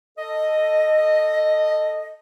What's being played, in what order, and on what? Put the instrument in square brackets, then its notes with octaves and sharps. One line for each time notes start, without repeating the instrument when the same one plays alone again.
[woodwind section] A4 D#5